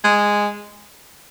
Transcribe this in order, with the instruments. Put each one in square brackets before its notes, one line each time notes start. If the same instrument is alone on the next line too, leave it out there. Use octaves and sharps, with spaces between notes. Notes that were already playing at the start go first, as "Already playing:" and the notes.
[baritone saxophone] G#3